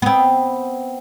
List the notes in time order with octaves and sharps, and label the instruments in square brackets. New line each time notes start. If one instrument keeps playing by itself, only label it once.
[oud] B3 C4